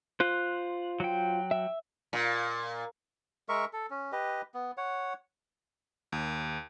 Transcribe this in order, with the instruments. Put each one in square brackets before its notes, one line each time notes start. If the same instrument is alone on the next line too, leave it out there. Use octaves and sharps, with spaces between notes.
[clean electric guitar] F4 C5 [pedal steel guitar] F#6
[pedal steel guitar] F#3 G5
[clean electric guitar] E5
[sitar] A#2
[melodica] G#3 A#4 E5 C#6
A4
C#4
G4 B4 D#5
B3
C#5 F#5
[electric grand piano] D#2